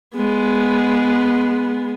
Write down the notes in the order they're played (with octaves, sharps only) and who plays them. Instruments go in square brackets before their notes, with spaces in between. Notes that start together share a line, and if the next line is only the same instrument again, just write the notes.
[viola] G#3 B3